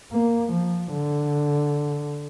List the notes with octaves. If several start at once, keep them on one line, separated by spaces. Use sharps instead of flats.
A#3
F3
D3